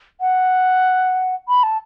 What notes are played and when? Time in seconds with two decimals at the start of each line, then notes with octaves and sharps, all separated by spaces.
0.21 F#5
1.48 B5
1.63 A5